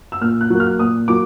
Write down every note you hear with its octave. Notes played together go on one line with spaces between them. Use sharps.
E6
A#2 F6
F#6
F#3 A#3
F6
A#2 D#6
F#3 A#3 D6